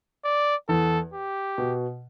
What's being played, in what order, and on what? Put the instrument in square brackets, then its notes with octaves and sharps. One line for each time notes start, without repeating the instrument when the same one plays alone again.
[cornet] D5
[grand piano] E2 E3 [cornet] A4
[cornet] G4
[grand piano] B2